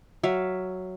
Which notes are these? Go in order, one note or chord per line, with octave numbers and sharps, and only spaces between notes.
F#3 E5 F5